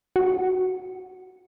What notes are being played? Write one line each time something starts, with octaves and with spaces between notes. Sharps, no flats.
F#4